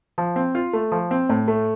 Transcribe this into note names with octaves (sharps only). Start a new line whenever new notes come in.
F3
C4
F4
A3
F3
C4
A2
A3